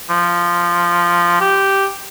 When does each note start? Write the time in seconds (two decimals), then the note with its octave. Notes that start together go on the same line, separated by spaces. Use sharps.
0.10 F3
1.41 G4